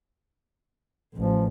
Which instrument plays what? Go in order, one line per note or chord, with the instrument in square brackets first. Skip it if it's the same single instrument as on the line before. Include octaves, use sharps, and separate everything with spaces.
[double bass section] A1 [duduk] F3